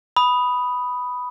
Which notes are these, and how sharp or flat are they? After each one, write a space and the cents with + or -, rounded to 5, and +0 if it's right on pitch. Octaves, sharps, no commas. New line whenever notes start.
B5 +0 D#6 +0